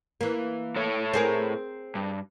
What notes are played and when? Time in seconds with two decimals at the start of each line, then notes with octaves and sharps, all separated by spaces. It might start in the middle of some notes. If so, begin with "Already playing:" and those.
0.21 E3 A#3
0.76 A2 A4 C#5
1.14 C4 G#4 A#4
1.95 G2